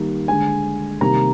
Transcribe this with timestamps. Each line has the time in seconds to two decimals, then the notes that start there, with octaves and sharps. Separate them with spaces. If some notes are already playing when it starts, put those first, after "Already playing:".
Already playing: D#3 G3 A#3
0.28 D3 G#3 G#5
1.01 C3 D#3 G3 A#3 A#5